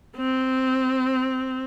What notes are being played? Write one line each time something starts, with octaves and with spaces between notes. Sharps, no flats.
C4